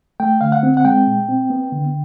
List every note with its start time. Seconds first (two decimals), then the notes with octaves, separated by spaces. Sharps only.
0.20 A3 G5
0.41 D3 F5
0.52 F#5
0.63 C4
0.77 F#5
0.85 G#3 G5
1.07 A#2
1.29 C4
1.50 B3
1.72 D3